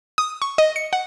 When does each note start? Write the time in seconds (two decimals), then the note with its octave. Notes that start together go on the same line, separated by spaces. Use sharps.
0.18 D#6
0.42 C#6
0.58 D#5
0.76 C#7
0.93 F#5